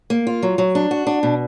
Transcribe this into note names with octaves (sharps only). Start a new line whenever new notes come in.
A#3
F4
F#3
F#3
D4
F#4
D4
B2